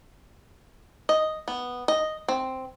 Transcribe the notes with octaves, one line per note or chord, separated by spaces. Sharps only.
D#5
B3
D#5
C4